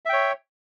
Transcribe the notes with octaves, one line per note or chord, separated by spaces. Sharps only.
C#5 E5 G5